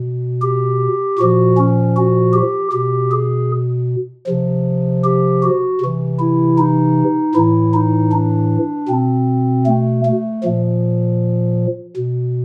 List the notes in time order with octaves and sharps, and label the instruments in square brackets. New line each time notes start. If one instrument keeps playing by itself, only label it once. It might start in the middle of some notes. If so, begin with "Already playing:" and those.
Already playing: [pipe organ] B2
G4
A#2 F3 F#4
C#4
F#4
G4
B2 G4
G#4
C3 F3
G4
F#4
C3 E3
E4
D#4
A2 E3 E4
D#4
D4
B2 C4
A3
A3
A#2 F3
B2